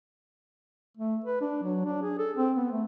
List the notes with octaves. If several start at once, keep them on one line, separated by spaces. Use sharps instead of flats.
A3
B4
D4
F#3
D4
G#4
A4
C4
B3
A3